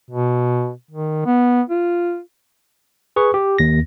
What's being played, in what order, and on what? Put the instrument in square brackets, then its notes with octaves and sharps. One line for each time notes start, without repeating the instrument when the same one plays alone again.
[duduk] B2
D#3
B3
F4
[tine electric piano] G#4 B4 C#6
G4
D#2 A#6